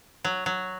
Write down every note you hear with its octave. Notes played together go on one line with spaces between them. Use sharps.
F#3
F#3